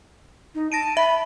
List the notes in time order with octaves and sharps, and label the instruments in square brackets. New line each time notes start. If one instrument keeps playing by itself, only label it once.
[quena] D#4
[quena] A5 [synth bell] A#6 D7 D#7
[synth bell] E5 [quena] B5